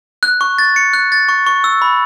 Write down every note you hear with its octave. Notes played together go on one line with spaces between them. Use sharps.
F#6
C#6
A6
C#7
F#6
A6
C#6
C#6
E6
B5